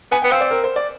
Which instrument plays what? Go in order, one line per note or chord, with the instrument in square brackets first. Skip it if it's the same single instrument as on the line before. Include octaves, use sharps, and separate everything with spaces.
[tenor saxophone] B3 [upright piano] G#5
[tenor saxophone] B3 [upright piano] G5
[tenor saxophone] C4 [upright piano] F5
[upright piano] D5
A#4
C5
D5